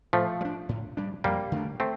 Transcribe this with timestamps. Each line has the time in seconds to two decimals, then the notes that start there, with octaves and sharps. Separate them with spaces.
0.13 A2 F3 A3
0.41 G3
0.45 D4
0.69 A2
0.97 G3 D4
1.24 F2 G3 A#3
1.52 D3 A3 D4
1.80 A3 C4